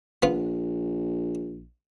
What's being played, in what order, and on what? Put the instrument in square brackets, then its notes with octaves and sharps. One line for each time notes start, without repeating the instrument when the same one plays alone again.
[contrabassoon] A#1 [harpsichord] B3 F4